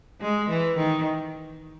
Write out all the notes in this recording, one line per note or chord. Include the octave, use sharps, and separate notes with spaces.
G#3
E3
D#3